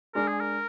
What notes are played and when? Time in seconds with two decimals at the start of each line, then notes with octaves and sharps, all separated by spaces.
0.15 G#3 D4 A#4
0.28 G#4
0.41 A#4